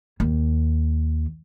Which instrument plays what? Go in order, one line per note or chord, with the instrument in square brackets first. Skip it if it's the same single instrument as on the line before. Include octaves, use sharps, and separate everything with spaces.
[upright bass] D#2